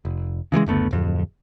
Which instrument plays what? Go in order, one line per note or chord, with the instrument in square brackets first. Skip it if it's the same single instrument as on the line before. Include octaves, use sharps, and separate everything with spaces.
[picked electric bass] F1
C#3 E3 F3 G#3
F#1 D2 A3 B3
D1 F2